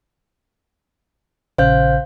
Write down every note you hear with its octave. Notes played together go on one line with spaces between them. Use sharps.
A#1 C#3 C5 F5 G6